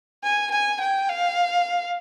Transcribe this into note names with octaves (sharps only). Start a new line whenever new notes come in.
G#5
G#5
G5
F5